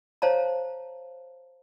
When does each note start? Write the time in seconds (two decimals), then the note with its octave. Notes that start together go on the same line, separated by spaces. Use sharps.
0.22 C5 C#5 F5 A5 A#5